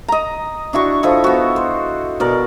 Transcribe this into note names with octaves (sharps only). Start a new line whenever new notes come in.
D#5 A#5
D4 E4 F#4 C#6
F3 E4 A4 D#5
B3 F#4
C5
B2 A#4 D5